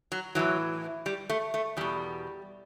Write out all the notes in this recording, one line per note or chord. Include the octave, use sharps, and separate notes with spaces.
F#3
A2 E3 F#3
G3
A3
A3
E2 B2 G3